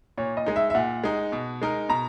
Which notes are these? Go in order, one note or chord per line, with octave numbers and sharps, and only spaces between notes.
A#2 C#5
D#5
G#3 D#4
E5
E5
A#2 F#5
G#3 D#4
B2
G#3 D#4 A#4
B2 A#5